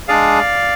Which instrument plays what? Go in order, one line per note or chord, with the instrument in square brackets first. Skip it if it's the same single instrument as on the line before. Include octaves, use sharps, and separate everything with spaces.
[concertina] G#3 D4 G#4 D5 F5